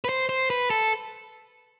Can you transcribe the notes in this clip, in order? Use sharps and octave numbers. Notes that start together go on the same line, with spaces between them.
B4
C5
C5
B4
A4